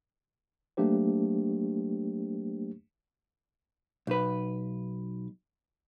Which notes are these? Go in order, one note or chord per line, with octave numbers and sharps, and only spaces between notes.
F#3 A3 A#3 D4 G4 C5
B1 B4